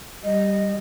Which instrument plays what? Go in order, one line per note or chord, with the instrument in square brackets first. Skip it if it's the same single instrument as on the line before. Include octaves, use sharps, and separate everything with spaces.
[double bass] G3 [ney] D#5